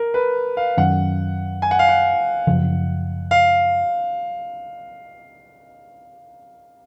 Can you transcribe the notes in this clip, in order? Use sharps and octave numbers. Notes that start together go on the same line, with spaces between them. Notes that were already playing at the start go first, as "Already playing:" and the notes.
Already playing: A#4
B4
F5
F#2 D#3 F#3 C#4 F#5
G#5
F#5
F5
F#5
F#2 C#3 F3
F5